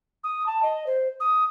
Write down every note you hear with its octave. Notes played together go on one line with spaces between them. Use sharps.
D#6
A5
D#5
C5
D#6